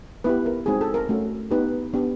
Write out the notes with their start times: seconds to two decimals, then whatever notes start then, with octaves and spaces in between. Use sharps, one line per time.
0.24 B3 E4 G4 B4
0.46 A#4
0.66 G#3 C4 D#4 F#4 G#4
0.81 A4
0.94 A#4
1.09 A3 C#4 F#4
1.51 B3 D#4 G4 B4
1.93 B3 D4 G4